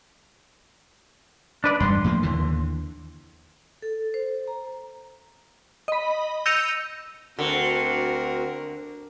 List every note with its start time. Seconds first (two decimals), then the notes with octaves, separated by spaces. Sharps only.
1.64 D4 B4 D5
1.80 E1 G2 D3 C6
2.04 A2 F3 A#3
2.23 D#2 D3 E3
3.82 A4
4.14 C5
4.48 A#5
5.88 D#5 B5
6.46 E6 G6 A#6 C#7 D#7 F7
7.39 D2 D3 C4 F#4 A#4